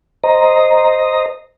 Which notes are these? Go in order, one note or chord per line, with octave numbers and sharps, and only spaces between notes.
C5 D#5 A#5